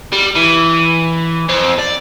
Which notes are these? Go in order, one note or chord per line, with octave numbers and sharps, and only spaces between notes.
G3
E3
F2 C4
D5